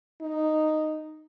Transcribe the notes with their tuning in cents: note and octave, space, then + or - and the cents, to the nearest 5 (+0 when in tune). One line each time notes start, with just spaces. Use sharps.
D#4 -5